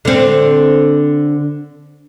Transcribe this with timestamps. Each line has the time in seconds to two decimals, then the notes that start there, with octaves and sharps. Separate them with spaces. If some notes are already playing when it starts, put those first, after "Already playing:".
0.05 D3 C4